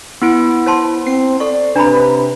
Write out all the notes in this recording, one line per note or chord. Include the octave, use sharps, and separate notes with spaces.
B3 E4 D7
C5 A5 C6
C4 C7
A4 D5 C#6
C3 D4 B4 A#5 B5